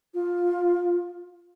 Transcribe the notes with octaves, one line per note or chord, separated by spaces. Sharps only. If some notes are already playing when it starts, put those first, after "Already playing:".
F4